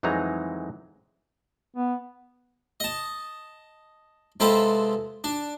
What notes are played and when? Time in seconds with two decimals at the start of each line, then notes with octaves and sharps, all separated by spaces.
0.03 F2 E3 F#3 G#3 D#4 A#5
1.76 B3
2.80 D#5 A5
4.40 C3 G#3 C4 F4 A4 B4
5.24 D4